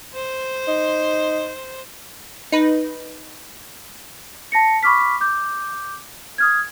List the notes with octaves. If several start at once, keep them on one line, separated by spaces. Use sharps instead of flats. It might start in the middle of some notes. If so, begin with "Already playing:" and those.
C5
D#4
D#4 B4
A5 A#6 C#7
B5 C#6 D6 F6 B6
D6 G6
D#6 F6 G#6